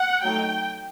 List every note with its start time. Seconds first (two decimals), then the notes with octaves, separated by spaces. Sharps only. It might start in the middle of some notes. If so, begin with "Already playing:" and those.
Already playing: F#5
0.22 F#3 A3 D#4 G5